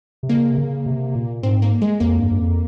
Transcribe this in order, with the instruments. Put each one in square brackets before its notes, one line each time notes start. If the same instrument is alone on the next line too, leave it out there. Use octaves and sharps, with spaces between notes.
[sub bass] C3
[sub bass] C#3 [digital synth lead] A#3
[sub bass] C3
C#3
C3
A#2
[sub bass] G#2 [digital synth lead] C4
[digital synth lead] A#3
G#3
[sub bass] F2 [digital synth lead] A#3
[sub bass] G2
G2
F2